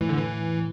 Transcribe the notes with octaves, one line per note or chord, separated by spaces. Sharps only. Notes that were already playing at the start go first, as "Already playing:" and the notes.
A2 E3
D3
E3